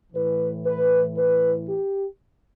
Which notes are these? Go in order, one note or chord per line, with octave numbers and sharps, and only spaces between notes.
A2 E3 B4
B4
B4
G4